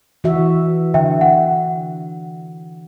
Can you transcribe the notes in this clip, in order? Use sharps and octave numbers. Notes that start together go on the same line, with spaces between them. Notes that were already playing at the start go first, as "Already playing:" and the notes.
E3 F#4 E5
D3 E5 G5
F#5